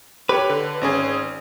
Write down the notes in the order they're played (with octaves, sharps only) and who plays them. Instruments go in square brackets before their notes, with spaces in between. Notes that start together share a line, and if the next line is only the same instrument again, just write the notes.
[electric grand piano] G4 C#5 [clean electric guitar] B4
[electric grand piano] D3
G#1 C#4 G#4